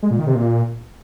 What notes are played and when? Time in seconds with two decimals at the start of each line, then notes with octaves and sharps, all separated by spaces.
0.03 G#3
0.11 A#2
0.19 D#3
0.27 C3
0.35 A#2